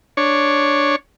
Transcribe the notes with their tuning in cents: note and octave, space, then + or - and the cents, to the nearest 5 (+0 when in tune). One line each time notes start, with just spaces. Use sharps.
D4 +0 C#5 +0